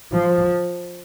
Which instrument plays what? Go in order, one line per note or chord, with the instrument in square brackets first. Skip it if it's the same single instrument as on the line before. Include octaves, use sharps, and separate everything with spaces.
[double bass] F3